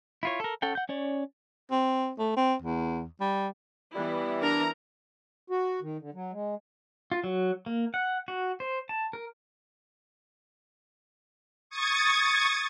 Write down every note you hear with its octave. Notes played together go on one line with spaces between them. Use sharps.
E4 F4 C#5
A4 A#4
C#4 A4 F#5 G5
F#5 G6
C#4 C#5 D5
C4
A3
C4
E2
G3
E3 G3 B3 E4
D4 A#4 A#5
F#4
D#3
D3
F#3
G#3
F4
F#3
A#3
F#5
F#4
C5
A5
A#4
C#6 D#6 G#6 A6 C#7